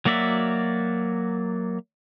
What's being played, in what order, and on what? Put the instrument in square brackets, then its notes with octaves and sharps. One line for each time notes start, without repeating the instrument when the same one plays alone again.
[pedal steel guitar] F#3 A#3 F#4 D5 E5